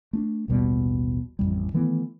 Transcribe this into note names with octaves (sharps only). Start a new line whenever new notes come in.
A3 C#4 D4
A1 D#2 B2 G3
A1 F2 A2 G3
D#3 E3 A3 B3